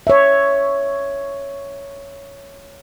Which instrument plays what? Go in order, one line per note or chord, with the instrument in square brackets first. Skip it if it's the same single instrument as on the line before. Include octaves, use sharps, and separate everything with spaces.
[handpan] C#5 E5